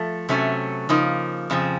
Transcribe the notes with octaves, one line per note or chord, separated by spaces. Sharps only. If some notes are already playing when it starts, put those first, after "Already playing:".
Already playing: F3 A3
C3 F#3 A3 C#4
C#3 F3 A#3 D#4
F2 C#3 F3 C4